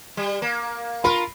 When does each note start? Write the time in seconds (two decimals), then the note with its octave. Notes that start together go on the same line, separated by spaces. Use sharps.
0.17 G3
0.42 A#3
1.04 F4 A#4 B5